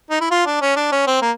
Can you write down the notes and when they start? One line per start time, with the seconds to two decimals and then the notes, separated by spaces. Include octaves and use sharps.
0.11 D#4
0.21 E4
0.31 F4
0.46 D4
0.61 C#4
0.77 D4
0.92 C#4
1.07 C4
1.22 A#3